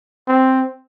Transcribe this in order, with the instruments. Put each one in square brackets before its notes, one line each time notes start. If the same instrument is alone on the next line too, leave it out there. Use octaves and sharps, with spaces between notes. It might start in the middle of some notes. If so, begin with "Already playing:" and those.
[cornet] C4